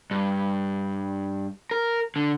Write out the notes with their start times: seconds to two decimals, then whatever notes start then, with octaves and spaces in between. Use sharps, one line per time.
0.11 G2
1.71 A#4
2.16 D3